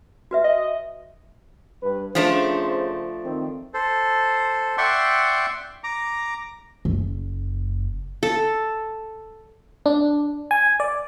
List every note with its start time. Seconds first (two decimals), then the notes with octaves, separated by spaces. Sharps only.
0.31 F#4 B4 E5
0.44 D#5
1.83 G2 B4
2.15 C#3 F3 A3 D4 C5
3.25 D#3 C4
3.74 A4 C5
4.78 D5 E5 F#5 G5 C6 C#6
5.84 A#5 D6
6.85 F#1
8.23 A4
9.86 D4
10.51 G#5
10.80 D5